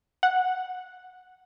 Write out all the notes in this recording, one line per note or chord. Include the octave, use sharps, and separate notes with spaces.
F#5